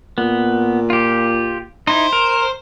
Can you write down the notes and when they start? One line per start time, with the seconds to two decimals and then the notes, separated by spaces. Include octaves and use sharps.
0.18 A#2 B3
0.90 F4 G4
1.87 D#4 E4 C5
2.13 A#4